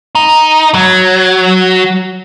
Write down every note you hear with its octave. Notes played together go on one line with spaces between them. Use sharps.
D#4
F#3